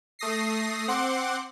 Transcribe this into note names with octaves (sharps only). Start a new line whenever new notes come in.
A3 D#6 A#6 C7
C4 F#5 C6 D6